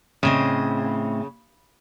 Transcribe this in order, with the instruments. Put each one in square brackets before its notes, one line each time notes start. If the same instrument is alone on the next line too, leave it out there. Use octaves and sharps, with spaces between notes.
[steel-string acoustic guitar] A2 C4 D#5 [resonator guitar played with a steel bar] C#3